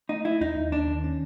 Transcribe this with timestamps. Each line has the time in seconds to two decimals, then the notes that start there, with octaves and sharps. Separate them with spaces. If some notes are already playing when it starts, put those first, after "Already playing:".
0.09 A3 D#4
0.25 A3 E4
0.41 D#2 D#4
0.57 D#2
0.72 D#2 D4
0.88 D#3
1.04 C#4